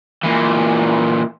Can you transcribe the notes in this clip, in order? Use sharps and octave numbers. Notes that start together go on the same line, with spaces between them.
A#2 E3